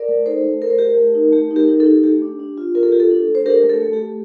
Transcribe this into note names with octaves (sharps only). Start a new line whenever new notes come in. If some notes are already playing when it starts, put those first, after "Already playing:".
Already playing: A#4 D5
A3
D#4 A4 C5
A3
A3 A#4
C5
A3 G4 A#4
A3
D#4
A3 G4
D#4
G4 A#4
D#4
A4
D#4
A3 G4
D4
D4
F4
F4 A#4
A4
F4 G4
A4
D4
A3
C5
D4 G4 A#4
A3
A4
A3
G4
A3